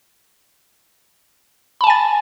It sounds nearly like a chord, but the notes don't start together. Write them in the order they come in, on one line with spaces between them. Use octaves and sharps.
B5 A5 G#5 A6